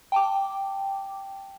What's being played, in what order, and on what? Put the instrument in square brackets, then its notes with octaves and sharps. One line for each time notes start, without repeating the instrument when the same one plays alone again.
[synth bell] G5 A5 D6